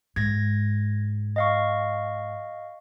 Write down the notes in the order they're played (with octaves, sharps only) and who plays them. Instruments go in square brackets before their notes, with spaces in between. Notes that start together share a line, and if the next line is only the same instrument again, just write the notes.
[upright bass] G#2 [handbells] G#6 A#6
[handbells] D#5 F5 C#6